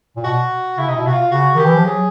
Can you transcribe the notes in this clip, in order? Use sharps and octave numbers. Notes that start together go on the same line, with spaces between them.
A#2
B2 F#4
C#3 E4
C3 D#4
B2 E4
C3 F#4
F4
C#3 F#4
D#3 G4
E3
F3
F#3 G#4